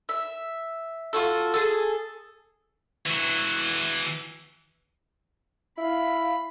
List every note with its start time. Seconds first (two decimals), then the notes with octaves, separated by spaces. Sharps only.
0.09 E5
1.13 F4 F#4 A4
1.54 G#4 A4
3.06 E3 F#4
5.78 E4 F5 B5